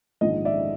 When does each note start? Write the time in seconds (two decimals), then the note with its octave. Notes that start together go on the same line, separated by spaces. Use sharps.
0.21 A#1 G#2 D#3 D#5
0.45 D5 E5